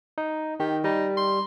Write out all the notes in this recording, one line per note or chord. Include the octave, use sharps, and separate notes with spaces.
D#4
D#3 G4
G3 D#4
C6